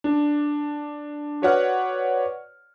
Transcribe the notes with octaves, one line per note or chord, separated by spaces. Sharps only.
D4
F#4 B4 C#5 D5 F#5 F6